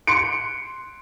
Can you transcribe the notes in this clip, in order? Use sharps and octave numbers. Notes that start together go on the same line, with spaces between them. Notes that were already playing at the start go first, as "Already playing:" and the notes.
C6 C#7 D7